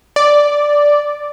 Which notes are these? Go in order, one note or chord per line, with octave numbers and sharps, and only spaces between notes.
D5